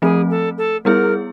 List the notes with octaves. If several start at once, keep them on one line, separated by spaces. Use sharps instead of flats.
F3 A3 C4 G#4
A4
A4
G3 B3 E4 G#4 A#4